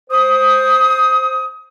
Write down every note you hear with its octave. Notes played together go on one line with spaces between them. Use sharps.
C5 D#6